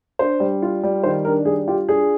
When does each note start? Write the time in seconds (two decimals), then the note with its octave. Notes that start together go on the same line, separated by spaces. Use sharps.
0.19 D4 C5
0.40 G3
0.62 F4
0.83 G3
1.03 D#3 C5
1.25 D4 A#4
1.45 G3 G#4
1.68 F4 G4
1.88 D4 G#4